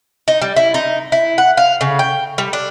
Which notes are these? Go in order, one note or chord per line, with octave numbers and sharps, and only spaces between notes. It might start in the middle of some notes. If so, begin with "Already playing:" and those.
D#4
G3
E4
D#4
E4
F#5
F5
C#3
G5
G3
D4